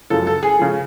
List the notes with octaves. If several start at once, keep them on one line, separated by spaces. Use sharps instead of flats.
F#2 C#3 F3 A4
A4
G#4
C#3 F3